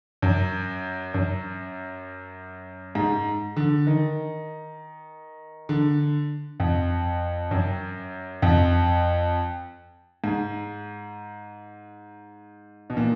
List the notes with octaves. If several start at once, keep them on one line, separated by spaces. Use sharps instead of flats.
F#2
F#2
G#2
D3
D#3
D3
F2
F#2
F2
G#2
B2
A#2